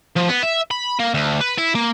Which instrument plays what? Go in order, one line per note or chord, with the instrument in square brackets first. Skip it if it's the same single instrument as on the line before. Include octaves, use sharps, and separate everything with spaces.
[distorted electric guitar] F3
B3
E5
B5
A#3
D2
B4
E4
A#3